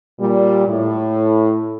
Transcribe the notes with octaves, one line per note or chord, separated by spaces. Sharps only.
A#2 G3
A2